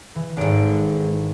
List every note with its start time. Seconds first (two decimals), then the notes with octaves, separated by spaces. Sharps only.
0.15 E3
0.37 G#1 G#2 D3 D7